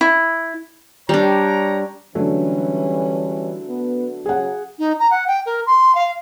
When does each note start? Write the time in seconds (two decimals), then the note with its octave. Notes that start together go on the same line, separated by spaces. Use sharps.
0.01 E4
1.09 G3 D4 C#5 G5 A#5
2.15 D3 E3 F#3 G3 A3 C#4
3.68 B3
4.26 C#3 F#3 G#4 F#5
4.79 D#4
4.99 A#5
5.11 F#5
5.27 G5
5.46 A#4
5.67 C6
5.95 F5